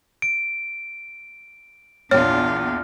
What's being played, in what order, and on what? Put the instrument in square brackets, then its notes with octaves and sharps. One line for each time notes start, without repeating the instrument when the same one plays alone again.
[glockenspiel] D7
[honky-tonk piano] A#1 E2 [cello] D4 F4 [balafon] C#5 [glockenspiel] F6